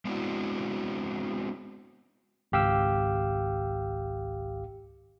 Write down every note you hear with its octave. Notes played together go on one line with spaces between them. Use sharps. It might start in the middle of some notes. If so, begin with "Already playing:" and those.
G#3 B3 C4 D4 E4 F#4
G#1 C#2 G4 F5 G5 E6